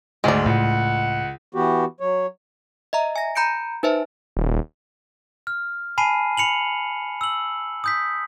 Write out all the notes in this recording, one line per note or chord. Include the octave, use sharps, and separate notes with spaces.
D2 G#2 G#3 D5
C#2 A2 F#5
E3 B3 F#4 G4
F#3 C#5
D#5 E5 A#5
G#5 A#6
A#5 B5 G6 C#7 D7
D#4 B4 C5 E5 A5
D#1
F6
G#5 A5 B5 C7 D#7
B5 C#7 F7 F#7
E6 F#7
D#6 G6 B6